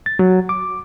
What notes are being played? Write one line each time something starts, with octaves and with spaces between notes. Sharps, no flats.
A6
F#3
D6